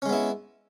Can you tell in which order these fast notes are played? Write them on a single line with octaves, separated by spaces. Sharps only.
C#4 G#3 B3 E4